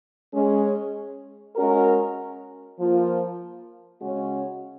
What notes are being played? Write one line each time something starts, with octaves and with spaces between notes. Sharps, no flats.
G#3 C#4 G#4
G#3 C#4 F#4 A#4
F3 A#3 F4
C#3 G#3 C#4 F#4